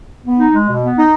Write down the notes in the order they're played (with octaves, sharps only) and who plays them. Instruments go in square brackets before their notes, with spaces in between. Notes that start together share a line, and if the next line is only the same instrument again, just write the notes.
[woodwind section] B3
D#4
G#3
B2
B3
D#4